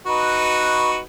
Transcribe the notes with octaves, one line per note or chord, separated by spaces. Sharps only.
D#4 F#4 B4